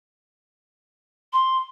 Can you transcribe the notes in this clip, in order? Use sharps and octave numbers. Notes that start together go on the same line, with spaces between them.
C6